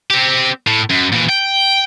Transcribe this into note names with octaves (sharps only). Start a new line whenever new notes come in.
C4 G4
A2
F#2
A#2 E3
G5